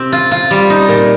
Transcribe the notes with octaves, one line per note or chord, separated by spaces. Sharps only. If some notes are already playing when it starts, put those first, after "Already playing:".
Already playing: C3 C4 G4
F4
F4
G3
D#4
A#2